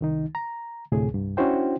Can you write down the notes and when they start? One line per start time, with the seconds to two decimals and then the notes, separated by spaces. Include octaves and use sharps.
0.01 C2 D#3 D#4
0.35 A#5
0.92 D2 A2 C3 G#4
1.10 C2 G2
1.37 C#4 D4 E4 F#4 C5 G5